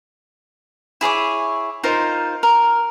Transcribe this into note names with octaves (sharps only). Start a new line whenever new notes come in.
E4 G#4 C#5 D6
D#4 F4 A#4 C5
A#4